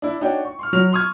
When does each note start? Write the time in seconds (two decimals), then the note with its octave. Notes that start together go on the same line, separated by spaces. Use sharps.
0.02 D4 E4
0.21 D4 D#4 F#4 C#5 G5
0.45 C#6
0.59 C6 C#6 F6
0.73 F#3 F6 F7
0.92 C6 C#6 D#6 F6 G#6